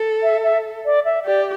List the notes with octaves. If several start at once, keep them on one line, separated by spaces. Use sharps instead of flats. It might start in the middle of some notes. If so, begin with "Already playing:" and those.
Already playing: A4
E5
E5
D5
E5
G4 D5